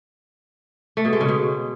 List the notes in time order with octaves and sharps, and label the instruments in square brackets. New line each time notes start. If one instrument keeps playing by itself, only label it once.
[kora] A3
B2
G#3
C#3
B2